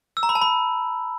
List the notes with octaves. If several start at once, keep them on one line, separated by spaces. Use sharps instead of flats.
E6
A#5
B5
A5
B5